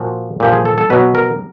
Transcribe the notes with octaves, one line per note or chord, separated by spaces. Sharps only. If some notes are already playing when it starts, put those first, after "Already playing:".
Already playing: A#2 F3 F#4
A#2 F3 G4
G#4
A4
A4
B2 F#3 B4
A#4